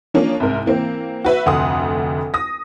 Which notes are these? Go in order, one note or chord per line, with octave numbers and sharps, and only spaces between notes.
F3 A#3 C#4 D4
C2 G#2 A#4
E3 A#3 C4
F#4 B4 E5
F1 D2 F#5 C6 D#6
D#6 A#6